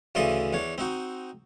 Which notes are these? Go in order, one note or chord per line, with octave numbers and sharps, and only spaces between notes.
D2 C#3 E3 D5 D#5 C6
E2 D4 C#5
C4 D#4 F#4